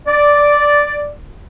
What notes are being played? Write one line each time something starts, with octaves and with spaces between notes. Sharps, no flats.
D5